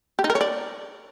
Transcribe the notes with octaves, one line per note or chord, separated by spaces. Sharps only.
G4
D#4
A#4
C#5
D5